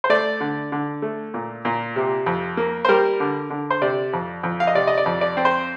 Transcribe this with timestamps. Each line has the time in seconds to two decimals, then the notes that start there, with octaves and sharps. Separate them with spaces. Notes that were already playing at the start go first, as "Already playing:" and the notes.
0.04 C5
0.09 A3 D5
0.40 D3
0.72 D3
1.02 A3
1.34 A#2
1.65 A#2
1.96 C3
2.26 F2
2.57 A#3
2.85 C5
2.88 G3 A#4
3.20 D3
3.50 D3
3.70 C5
3.82 C3 D5
4.13 F2
4.43 F2
4.60 F5
4.67 D#5
4.75 C3 D5
4.87 D#5
4.98 D5
5.06 F2
5.21 D5
5.37 C4
5.45 C5